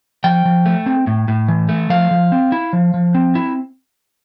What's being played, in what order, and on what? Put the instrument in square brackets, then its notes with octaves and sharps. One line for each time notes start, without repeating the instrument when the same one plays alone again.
[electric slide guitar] F3 G5
F3
A3
C4
A2
A2
E3
A3
F3 F5
F3
C4
E4
F3
F3
C4
E4